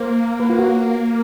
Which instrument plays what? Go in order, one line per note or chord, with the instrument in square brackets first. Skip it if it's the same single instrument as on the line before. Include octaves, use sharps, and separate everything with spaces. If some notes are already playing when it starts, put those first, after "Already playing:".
Already playing: [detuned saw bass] A#3 [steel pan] C5
[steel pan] B4
F4
F#4